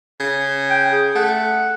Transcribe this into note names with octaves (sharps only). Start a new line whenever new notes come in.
C#3
G5
G#4
A3 F#5